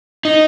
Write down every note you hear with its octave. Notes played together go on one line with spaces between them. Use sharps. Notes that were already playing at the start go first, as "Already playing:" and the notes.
D#4